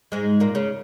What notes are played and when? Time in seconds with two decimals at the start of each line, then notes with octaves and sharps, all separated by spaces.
0.12 G#2 G#3
0.40 A#2 A#3
0.55 C#3